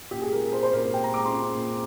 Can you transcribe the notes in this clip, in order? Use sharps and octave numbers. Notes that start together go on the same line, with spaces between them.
A#2 G4
G#4
G#3 A#4
A#4
C4 C5
C5
A#2 A#4
A#4
A#2 G5
A#5
G#3 D6
C6
C4
A#2